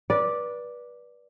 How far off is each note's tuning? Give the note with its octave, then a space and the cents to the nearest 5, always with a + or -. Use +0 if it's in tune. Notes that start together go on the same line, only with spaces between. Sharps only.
B4 -25 D5 +0